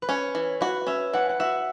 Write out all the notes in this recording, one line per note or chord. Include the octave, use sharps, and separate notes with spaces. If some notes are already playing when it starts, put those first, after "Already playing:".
B4
C#4 C#5
E3
F#4 B4
C#4 E5
E3 F#5
F#5
F#4 E5